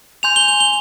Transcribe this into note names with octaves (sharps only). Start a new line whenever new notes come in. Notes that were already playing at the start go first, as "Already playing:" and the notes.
G#5 C6 G6 F7
G7
G7
G7